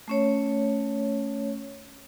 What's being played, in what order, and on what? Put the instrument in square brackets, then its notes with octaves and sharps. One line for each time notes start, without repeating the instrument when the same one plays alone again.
[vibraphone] A3 C#4 C#5